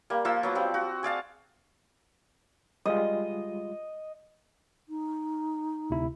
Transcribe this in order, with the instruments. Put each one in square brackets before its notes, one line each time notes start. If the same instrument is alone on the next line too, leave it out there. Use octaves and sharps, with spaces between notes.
[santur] G3 A#3
F3 A#3 F4 E6
F#3 B3 D6
F3 G3 C4
F#4
G#4 D5 F5 A5
[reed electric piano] G3 G#3 F4 [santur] D#5
[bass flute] D#4
[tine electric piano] D2 C3 E4